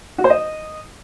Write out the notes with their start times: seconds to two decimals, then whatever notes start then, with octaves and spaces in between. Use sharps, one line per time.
0.18 F#4
0.24 C5
0.30 D#5